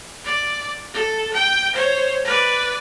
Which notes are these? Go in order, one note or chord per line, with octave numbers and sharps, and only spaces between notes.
D5
A4
G5
C5 C#5
B4 D5